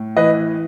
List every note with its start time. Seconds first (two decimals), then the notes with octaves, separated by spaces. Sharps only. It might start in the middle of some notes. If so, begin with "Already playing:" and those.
Already playing: A2
0.17 E3 B4 D#5